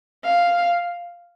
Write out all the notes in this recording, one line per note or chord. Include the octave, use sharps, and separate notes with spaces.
F5